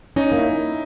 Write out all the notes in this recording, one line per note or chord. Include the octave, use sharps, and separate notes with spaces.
C#4 D#4
A#3 E4